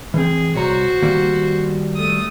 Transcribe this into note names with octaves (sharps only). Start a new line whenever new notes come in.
E3 C4 G#4
C2 F#4 C5 C#5 A#5
D#3 G3 A#3
A3 D#6